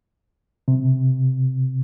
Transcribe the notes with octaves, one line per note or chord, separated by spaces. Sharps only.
C3